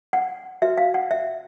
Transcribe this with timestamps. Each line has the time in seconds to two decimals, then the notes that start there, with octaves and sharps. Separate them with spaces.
0.13 F#5
0.62 F#4 E5
0.65 B4
0.78 F5
0.94 F#5
1.11 E5